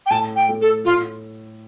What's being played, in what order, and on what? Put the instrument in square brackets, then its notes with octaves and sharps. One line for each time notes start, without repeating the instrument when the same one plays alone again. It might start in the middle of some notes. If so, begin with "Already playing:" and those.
[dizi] G5
[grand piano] A2 [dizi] A5
[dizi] G5
[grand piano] A3
[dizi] A4
[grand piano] A2 [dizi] F4